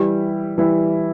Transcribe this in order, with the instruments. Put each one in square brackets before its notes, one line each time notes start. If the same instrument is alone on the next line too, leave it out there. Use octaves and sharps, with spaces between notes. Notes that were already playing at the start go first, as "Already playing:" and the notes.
Already playing: [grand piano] E3 G3 E4 [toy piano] G4
[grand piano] E3 G3 E4